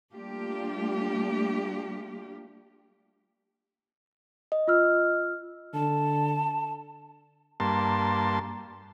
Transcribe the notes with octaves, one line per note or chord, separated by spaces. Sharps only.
G3 A3 A#3 D4 F4 G4
D#5
F4 E6 F6
D3 A5
G2 A#3 A5 C6